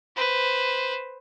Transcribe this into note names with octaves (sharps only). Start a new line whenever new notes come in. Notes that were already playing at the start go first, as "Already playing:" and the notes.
B4 C5